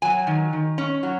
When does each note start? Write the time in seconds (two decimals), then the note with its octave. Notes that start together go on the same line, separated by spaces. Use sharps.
0.02 F#3 G#5
0.27 D#3
0.53 D#3
0.78 C#4
1.03 F#3